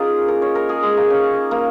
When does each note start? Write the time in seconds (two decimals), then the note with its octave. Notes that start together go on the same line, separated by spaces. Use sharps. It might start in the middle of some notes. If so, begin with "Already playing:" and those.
Already playing: A#3 C#4 D#4 F4 G#4 A#4
0.28 A#4
0.42 C#5
0.55 A#4
0.69 G#4
0.83 G#3
0.97 A#3
1.10 C#4
1.51 A#3